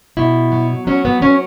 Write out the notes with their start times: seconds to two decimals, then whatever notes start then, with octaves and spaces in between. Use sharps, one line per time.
0.17 B2 E4
0.52 F#3
0.87 F#3 C#4
1.05 B3
1.22 F#3 C#4